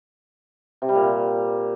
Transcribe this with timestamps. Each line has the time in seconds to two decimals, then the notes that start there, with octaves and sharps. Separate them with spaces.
0.82 C3
0.89 G3
0.96 A#2